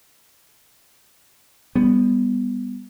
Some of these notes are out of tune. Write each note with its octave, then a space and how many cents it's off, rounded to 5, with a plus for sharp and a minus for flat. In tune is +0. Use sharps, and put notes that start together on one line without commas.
G3 +25 B3 +0